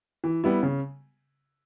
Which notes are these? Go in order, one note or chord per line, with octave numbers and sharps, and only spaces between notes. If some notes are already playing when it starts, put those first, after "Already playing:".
E3
G3 B3 E4
C#3